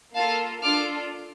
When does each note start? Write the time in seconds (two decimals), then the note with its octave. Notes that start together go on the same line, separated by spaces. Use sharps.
0.15 A#3 F4 A4 F5 A5
0.62 D4 F4 A4 D6 F6